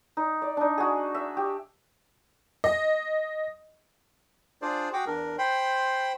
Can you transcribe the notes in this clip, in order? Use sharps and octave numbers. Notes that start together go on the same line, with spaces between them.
D#4
D5
D4 D#4
F#4 G#4
E5
G4
D#5
D4 F4 G#4 C5 D5
F#4 G#4 F#5 G5 D6
E2 D4 A#4
C5 G5 B5 C6